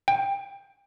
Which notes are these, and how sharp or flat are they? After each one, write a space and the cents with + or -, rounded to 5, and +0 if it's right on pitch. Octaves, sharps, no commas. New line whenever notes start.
G5 +20